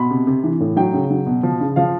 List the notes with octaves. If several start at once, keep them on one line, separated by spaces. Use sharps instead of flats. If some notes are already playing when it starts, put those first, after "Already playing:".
Already playing: B2 B5
C3
C3
E3
A2
F#3 G5
C#3
F#3
B2
F3
C#3
F3 F5